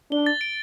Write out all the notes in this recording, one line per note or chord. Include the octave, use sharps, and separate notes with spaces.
D4 G7
A6
D7